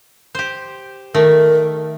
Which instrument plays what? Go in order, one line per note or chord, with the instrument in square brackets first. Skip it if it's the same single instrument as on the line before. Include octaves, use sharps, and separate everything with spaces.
[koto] G4 C5
[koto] D#3 A3 [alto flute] A#4